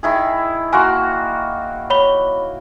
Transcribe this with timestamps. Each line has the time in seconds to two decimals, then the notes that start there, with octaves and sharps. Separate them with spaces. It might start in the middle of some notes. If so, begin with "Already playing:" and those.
0.03 D#3 E4 G#4
0.73 A#3 F#4 G#5 C6
1.90 C#5 B5 G7